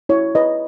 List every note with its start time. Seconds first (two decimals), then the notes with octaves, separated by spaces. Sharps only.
0.09 E4 C#5
0.35 B4 D#5